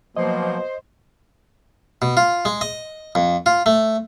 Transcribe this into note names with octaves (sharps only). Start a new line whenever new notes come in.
B2 F3 F#3 A#3 C5 D#5
B2
F4
G#3
D#5
F2
F4
A3